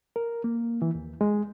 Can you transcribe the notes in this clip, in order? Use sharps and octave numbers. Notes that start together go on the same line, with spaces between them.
A#4
A#3
E3
D#2
G#3